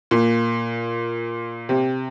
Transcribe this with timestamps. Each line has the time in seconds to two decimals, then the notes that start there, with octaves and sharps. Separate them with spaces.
0.11 A#2
1.69 C3